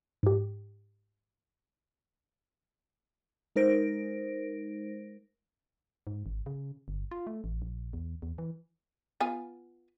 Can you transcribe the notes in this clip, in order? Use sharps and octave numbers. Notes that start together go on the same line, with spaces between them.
G#2 G4
G#3 D#4 A#4 C5 A#6 D7
G#2
G#1
C#3
G1
F4
A3
A1
A#1
E2
E2
E3
B3 F4 G#5